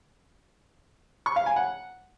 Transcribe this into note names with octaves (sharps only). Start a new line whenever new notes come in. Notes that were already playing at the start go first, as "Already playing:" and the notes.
C#6
F5
G#5
F#5